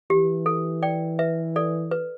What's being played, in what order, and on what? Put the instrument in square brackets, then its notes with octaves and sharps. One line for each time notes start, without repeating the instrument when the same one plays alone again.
[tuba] E3 [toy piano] G4
[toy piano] A4
D5 G5
B4 E5
A4 D5
B4